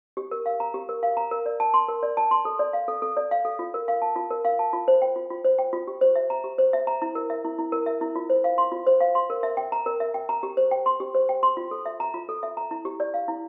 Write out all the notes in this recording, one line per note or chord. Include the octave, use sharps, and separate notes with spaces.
G4
A#4
F5
A#5
G4
A#4
F5
A#5
A#4
D5
A5
C6
A#4
D5
A5
C6
A4
D5
F5
A4
A4
D5
F5
A4
F4
A#4
F5
A5
F4
A#4
F5
A5
F4
C5
G5
F4
F4
C5
G5
F4
G4
C5
E5
A#5
G4
C5
E5
A#5
E4
A#4
E5
E4
E4
A#4
E5
E4
F4
C5
F5
C6
F4
C5
F5
C6
A#4
E5
G5
A#5
A#4
E5
G5
A#5
G4
C5
G5
C6
G4
C5
G5
C6
F4
A4
E5
A#5
F4
A4
E5
A#5
E4
G4
D5
F5
E4